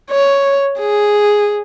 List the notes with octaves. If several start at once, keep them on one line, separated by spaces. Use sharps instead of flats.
C#5
G#4